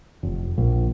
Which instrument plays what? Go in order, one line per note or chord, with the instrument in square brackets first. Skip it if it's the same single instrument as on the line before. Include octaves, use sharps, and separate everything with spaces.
[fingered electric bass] F1
A#1